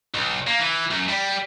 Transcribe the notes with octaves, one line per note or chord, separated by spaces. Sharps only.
B1
A#3
E3
F#2
G3